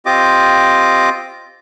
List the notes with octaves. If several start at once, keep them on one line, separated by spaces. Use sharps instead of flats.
C4 F4 G4 D#5 D6